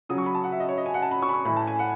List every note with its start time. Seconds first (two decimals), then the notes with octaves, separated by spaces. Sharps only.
0.09 C#3 F#3 D#6
0.18 C#6
0.26 B5
0.35 A5
0.44 F#5
0.52 E5
0.60 D#5
0.69 C#5
0.78 D#5
0.86 G#5
0.94 F#5
1.02 A5
1.11 B5
1.23 C#6
1.29 B5
1.34 C#6
1.45 A2 E3 B5
1.57 A5
1.67 G#5
1.79 F#5